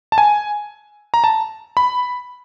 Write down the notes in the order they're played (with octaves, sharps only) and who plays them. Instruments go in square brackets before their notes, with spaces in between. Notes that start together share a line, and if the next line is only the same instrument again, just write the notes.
[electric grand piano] A5
G#5
A#5
A5
B5